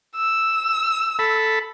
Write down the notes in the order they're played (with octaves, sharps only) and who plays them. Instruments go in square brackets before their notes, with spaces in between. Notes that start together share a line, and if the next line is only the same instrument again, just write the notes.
[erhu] E6
[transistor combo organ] A4 B5